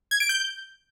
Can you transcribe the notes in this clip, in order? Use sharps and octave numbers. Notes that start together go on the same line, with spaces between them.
G#6
D7
G6